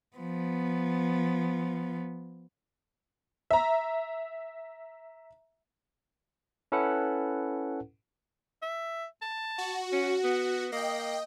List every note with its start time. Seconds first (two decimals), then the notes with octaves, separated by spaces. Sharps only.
0.17 F3 B3
3.51 E5 A#5
6.72 C#4 E4 A4 B4 F#5
8.62 E5
9.22 A5
9.58 F#4
9.92 C#4
10.24 B3
10.72 A#3 D#5 G5